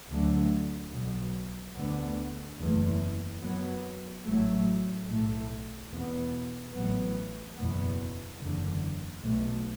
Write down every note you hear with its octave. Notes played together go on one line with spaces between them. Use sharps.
D2 D3 F#3 A3
B1 B2 F#3
D2 D3 B3
F#1 E2 E3 A3
F#2 F#3 B3
A1 A2 F#3 A3
B1 A2 A3
E2 B2 B3
A1 A2 F#3 B3
F#1 E2 B2 B3
F#1 E2 D3
B1 B2 A3